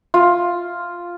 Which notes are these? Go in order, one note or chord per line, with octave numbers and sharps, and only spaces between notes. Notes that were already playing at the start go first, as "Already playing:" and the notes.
F4